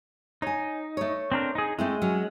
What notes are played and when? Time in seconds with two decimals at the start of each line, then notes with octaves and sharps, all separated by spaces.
0.42 D#4 C#5 G#5
0.97 A3 C#5
1.32 C4 D4 A#4
1.55 D#4 G#4
1.79 G#3 A3 C4 E4
2.02 F#3 C#4